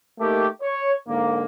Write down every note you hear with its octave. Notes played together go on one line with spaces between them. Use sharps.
A3 A#3 D#4 G4
C#5
G#2 D3 A#3